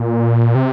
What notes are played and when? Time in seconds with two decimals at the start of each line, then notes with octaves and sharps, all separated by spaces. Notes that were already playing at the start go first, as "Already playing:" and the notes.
Already playing: A#2
0.55 C3